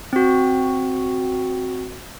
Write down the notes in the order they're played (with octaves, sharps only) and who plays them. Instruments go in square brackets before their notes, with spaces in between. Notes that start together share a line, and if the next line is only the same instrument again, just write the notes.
[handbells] C4 F#4